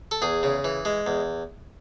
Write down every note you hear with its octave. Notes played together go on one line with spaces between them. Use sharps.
A4
E2 G#4
C#3
E3
G#3
E2